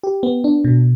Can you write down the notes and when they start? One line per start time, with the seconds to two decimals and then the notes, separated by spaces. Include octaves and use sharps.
0.03 G4
0.23 B3
0.44 D4
0.64 B2